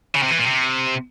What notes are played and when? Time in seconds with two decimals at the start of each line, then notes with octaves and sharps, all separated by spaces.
0.15 C#3
0.23 C3
0.30 E3
0.38 A#2
0.46 C3